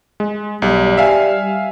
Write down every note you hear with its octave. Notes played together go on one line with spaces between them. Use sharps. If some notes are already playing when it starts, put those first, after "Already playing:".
G#3
B1 G3
E5 F5 G#5